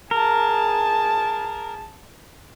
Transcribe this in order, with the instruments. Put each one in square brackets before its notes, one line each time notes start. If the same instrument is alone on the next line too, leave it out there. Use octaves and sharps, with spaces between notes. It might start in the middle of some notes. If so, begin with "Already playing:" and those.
[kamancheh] G#4 A5 [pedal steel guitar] A#4